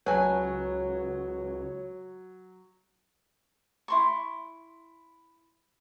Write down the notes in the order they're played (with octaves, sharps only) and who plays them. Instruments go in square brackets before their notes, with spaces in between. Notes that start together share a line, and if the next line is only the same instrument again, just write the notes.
[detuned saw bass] C#2 [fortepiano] F#3 [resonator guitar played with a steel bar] B4 G#5 [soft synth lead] C#5
[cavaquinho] E4 C6 C#6